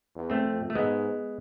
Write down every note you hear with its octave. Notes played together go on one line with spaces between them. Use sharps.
E2
A3 C4
F2
A3
G#2 G#3 B3